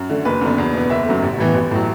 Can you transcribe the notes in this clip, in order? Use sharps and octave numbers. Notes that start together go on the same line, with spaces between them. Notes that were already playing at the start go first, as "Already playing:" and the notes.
Already playing: F#2
D3 A3
F#1 B4
F#2 D3 B3
E2
B2 B3
F#1 E5
F#2 F#3 A3
A1
A2 E3 B3
A1
A2 F#3